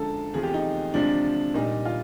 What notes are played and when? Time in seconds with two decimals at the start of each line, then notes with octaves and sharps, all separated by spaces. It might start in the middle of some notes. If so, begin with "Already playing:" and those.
Already playing: F#2 D3 F3 G#3 A4
0.34 E2 C3 F3 A3 G#4
0.43 G4
0.54 D#4
0.94 C3 F3 G#3 D4
1.54 A#2 G3 D#4
1.86 F4